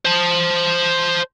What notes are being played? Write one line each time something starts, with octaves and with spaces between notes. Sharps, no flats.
C5 A5